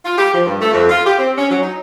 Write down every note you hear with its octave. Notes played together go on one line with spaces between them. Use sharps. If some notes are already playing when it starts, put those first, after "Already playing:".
F4
G4
F3
G2
A3
F2
F4
G4
C4
C#4
F#3
D#4